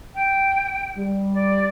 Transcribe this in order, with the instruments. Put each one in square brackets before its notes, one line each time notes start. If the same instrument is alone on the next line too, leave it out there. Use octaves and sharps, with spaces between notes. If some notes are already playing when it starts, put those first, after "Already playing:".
[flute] G5
[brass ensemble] G3
[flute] D5